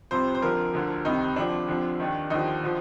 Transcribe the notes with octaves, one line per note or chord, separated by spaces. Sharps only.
C2 C3 F3 C5
C5
F2 D3 F3 A#4
D2 D3 F3
C2 C3 D#3 D#4
F2 D3 F3 D4
F2 D3 F3
D#2 D#3
D#2 D3 F3 D#4
D3 F3